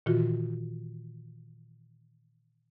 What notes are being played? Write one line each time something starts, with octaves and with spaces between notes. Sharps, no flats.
A#2 D#3 E3 F4 F#4